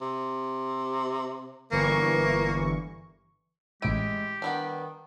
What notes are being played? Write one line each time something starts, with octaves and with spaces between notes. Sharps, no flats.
C3
G1 E3 A#3 C#6
A1 A2 G#3 E4 G4 D7
D#3 G3 B3 D4